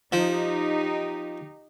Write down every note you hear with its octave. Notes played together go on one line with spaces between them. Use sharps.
F3 D#4 G4